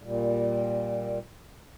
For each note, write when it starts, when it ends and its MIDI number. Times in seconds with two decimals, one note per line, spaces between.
0.03 1.19 46
0.03 1.19 55